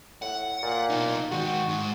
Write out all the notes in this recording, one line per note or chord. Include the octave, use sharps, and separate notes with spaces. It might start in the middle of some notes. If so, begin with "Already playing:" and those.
A2 F#5
A#2
B2 D#4
D#3 G#3 F#4
G#2